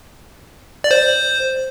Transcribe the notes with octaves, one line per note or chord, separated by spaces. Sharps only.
D5
C5